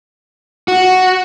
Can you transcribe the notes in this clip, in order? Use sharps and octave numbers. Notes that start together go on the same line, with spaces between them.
F#4